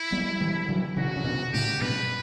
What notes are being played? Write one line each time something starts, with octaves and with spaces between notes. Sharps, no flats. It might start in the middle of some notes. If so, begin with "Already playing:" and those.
Already playing: E4
G3 B3
E3 G3
D3 F#3
C#3 E3 F#4
C#3
B2 D3
A2 C#3 G4
G2 B2 B4